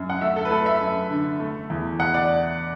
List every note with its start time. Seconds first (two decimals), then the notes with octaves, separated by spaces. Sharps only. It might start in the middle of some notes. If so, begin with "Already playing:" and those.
Already playing: F#2
0.10 F#5
0.21 A3 E5
0.36 A4
0.45 B4
0.51 A3 A4
0.66 E5
0.80 F#2
1.10 D3
1.40 A3
1.70 E2
1.99 E2 F#5
2.14 D5